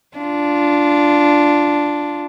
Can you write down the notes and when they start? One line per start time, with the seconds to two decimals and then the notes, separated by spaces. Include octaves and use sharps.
0.18 D4 F4